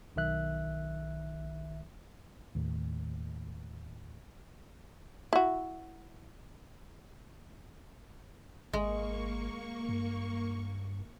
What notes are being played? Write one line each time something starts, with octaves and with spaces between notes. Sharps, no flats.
B1 D#3 E5 F#6
D#2 A2
E4 F#4
G#1 G#3 A#3 C#6
G2